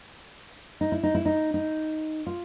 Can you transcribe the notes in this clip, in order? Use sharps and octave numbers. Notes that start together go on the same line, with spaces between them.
D#4
E4
D#4
E4
D#4
D#4
F4